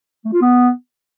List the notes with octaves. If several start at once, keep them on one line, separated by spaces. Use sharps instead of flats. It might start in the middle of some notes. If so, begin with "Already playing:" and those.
A3
F4
B3